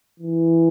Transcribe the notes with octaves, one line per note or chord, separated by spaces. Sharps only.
E3